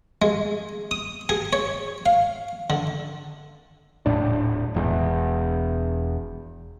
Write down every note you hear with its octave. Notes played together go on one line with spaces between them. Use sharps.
G#3
D#6
G#4
C#5
F5
D3
D#1 B1 A2 D4
E1 E2